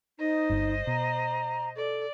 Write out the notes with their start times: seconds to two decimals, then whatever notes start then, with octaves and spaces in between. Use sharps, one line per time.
0.19 D#4 C5 D#5
0.50 G1 G2
0.87 B2 A#5
1.76 A4 D5